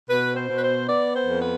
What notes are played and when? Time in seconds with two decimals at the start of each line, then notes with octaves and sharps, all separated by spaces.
0.08 B2 B4
0.35 C5
0.48 B2
0.56 B4
0.61 C5
0.87 B3 D5
1.13 C5
1.26 F2
1.40 B4